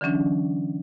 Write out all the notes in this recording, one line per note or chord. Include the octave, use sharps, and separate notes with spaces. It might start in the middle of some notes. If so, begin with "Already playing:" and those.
D3 E3 F#3 C#4 D4